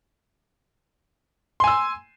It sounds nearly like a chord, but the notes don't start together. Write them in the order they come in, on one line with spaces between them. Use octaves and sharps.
C6 G#5 E6